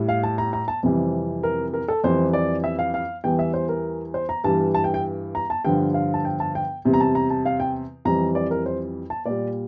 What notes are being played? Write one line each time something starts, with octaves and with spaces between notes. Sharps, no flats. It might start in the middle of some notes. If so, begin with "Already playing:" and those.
Already playing: A2 G3
F5
A5
A#5
A#5
A5
F2 C3 E3 G3
A#4
A#4
A4
F2 E3 G3 C5
D5
E5
F5
F5
E2 E3 G3 G5
E5
C5
A#4
C5
A#5
G2 E3 G3 A5
A5
G5
G5
A#5
A5
G2 D3 F3 G5
F5
A5
G5
A5
G5
E2 C3 G3
A#5
A5
A#5
A5
F5
G5
F2 E3 G3 A#5
D5
A#4
C5
A5
A#2 G3 D5